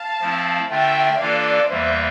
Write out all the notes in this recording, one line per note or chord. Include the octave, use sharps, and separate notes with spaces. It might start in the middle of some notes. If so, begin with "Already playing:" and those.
Already playing: F5 A5
F3 A3 C4 E4
D3 A3 D4 F4 A#4 E5 G5
E3 A#3 D4 F4 A4 D5 F5
E2 E3 G3 A#3 C5 E5